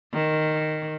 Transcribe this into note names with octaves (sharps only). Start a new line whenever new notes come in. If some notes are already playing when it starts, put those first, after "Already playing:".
D#3